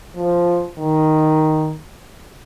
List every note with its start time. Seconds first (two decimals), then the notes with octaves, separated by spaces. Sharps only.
0.16 F3
0.78 D#3